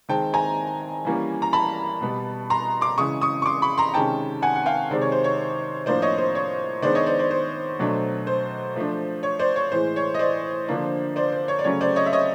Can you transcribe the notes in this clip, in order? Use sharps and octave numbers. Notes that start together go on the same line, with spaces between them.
D#3 G#3 C4 G5 A5
G#5 A#5
E3 G3 A#3 C#4
A#5
A5 B5
B2 G3 B3
A#5 C6
C6 D6
C#3 E3 G#3 C#6 D#6
C#6 D#6
C#6
C6 D6
B5 C#6
A#5 C6
C3 D#3 G#3 C#4 G5 A5
F#5 G#5
F#5
F5 G5
C3 D#3 G#3 C4 D5
C#5
C5
C#5
A2 F3 A#3 D4 C5 D5
C#5 D#5
C5
C#5
D#3 G#3 B3 D4 C5 D5
C#5 D#5
C5 D5
C5 D5
C5
B2 F#3 A3 D4
C5
F3 A3 D4
C#5
C5 D5
C#5
A2 E3 G#3 C5
C#5
D#5
C5 D5
D3 F3 A#3 D4
C5 D5
C5
C#5
D5
C#3 F#3 A3 C#4 C#5
C5 D5
C#5 D#5
E5
C#5 D#5